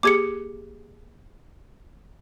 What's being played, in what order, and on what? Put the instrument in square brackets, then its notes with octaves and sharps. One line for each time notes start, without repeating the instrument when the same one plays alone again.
[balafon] A#3 G4 G#4 [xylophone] D6 G#6 C#7